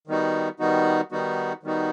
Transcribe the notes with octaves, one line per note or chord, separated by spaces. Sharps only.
D#3 G3 B3 D#4 F#4
D#3 G3 B3 D#4 F#4
D#3 G3 B3 D#4 F#4
D#3 G3 B3 D#4 F#4